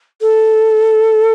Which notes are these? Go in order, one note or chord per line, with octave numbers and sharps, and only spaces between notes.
A4